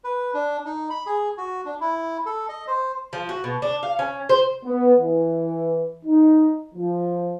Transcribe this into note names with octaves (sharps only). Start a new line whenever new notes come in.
B4
D4
D#4
B5
G#4
F#4
D4
E4
A4
D#5
C5
F3
F#4
B2
D4
F5
C#4
C5
B3
E3
D#4
F3